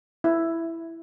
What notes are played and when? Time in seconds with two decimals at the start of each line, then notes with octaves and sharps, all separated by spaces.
0.24 E4